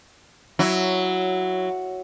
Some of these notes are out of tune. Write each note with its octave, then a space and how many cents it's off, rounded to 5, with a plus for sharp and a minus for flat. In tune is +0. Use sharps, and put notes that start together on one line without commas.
F#3 +0 E4 +0